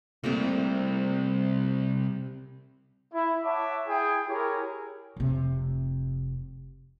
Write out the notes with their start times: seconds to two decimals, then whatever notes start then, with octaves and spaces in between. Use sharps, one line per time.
0.24 C2 C3 A3 A#3
3.14 E4
3.44 C#5 E5 F#5 A5 D6
3.88 E4 G#4 G5
4.28 E4 G4 G#4 A#4 C#5
5.16 F1 C3